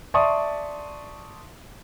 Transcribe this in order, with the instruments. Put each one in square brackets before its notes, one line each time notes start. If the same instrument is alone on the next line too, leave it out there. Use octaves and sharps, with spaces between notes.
[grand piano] D5 E5 A5 C6 C#6 D#6